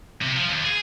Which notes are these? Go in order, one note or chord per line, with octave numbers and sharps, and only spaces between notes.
C3
F3
D#2
G#4